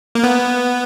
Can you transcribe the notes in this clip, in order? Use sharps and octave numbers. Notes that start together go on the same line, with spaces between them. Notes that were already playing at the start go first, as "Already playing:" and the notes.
A#3
B3